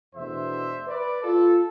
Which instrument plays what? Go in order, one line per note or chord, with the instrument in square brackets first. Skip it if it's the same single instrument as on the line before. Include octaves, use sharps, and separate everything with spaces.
[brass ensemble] E2 B2 A3 D4 C5 E5
B4 D5
F4 A4